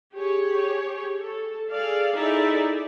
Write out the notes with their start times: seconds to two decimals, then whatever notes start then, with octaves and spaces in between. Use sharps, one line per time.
0.13 G4 G#4 C#5
1.17 A4
1.71 G#4 A4 D5 F5
2.14 D#4 E4 G#4 A4 D5 E5